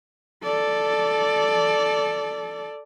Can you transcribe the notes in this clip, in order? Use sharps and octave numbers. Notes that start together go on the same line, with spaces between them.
A4 D5